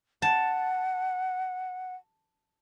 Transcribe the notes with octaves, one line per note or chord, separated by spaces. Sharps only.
F#5 A5